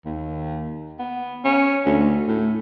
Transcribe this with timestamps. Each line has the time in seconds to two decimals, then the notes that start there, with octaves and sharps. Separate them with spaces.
0.05 D#2
0.99 B3
1.45 C#4
1.86 D2
2.28 A2